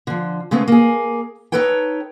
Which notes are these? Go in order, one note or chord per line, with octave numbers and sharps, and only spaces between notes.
D3 F3
C#3 G#3 A3 B3 C4
A#3 G#4
D#4 F4 A4 B4 C#5 G5